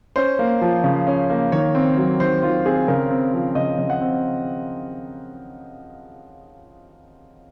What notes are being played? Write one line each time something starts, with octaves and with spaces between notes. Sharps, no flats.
C#4 C5
A#3
F3
C#3
C#4
A#3
D#3 C#5
C4
F#3
D#3 C5
D#3 F4
C4 G#4
C#3 A#4
C4
F3
C#3 D#5
C#3
F#5
C4